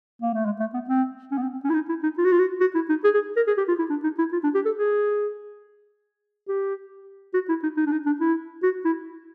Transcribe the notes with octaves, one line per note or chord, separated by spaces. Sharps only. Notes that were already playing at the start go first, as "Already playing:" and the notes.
A#3
A3
G#3
A3
B3
C4
C#4
B3
C4
C4
C#4
E4
D#4
E4
D#4
F4
F#4
F4
F#4
F#4
E4
D#4
G#4
G#4
A#4
G#4
G4
F4
E4
D4
D#4
E4
F4
D4
G4
A4
G#4
G4
F#4
E4
D#4
D#4
D4
D#4
D4
E4
F#4
E4